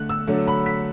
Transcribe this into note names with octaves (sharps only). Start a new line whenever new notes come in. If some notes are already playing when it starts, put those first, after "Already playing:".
Already playing: D3 A3 F#6
E6
D3 F#3 A3
B5
B6